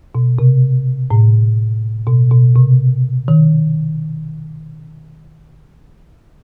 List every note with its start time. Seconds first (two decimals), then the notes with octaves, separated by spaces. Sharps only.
0.15 B2
0.39 C3
1.11 A2
2.07 B2
2.31 B2
2.56 C3
3.28 D#3